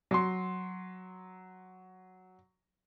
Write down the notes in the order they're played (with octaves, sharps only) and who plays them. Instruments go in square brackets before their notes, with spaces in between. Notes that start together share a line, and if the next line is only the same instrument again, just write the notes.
[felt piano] F#3 C6